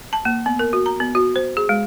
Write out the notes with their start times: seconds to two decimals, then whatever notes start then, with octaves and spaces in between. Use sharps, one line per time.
0.13 A5
0.25 A#3
0.46 B3
0.59 A#4
0.73 F#4
0.86 A#5
1.00 B3
1.15 F#4
1.36 C5
1.57 G#4
1.69 G#3